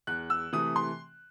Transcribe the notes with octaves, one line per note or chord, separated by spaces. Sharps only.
E2 F#6
E6
C3 E3 A3 D#6
C6